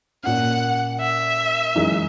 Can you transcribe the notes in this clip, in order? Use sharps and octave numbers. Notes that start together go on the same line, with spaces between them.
A#2 A#3 C#4 F#5
E5
F#2 E3 G#3 D#4